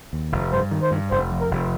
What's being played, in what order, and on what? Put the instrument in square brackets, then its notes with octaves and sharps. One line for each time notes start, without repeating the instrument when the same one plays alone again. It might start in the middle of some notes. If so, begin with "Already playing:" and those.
[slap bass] D#2
F1
[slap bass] G2 [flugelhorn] C5
[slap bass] D#3
[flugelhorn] C5
[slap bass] G2
[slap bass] F1 [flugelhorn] C5
[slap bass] F2
[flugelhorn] A#4
[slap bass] F1